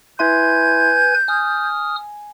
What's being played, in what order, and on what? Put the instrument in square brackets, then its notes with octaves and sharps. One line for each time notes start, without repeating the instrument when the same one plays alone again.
[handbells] E4 E5 C6 [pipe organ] B4 G#5 G#6 [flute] G6
[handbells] G#5 [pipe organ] D#6 F6